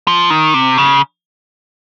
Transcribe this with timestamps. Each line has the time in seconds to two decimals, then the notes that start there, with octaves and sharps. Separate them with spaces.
0.07 F3
0.30 D#3
0.54 C3
0.78 C#3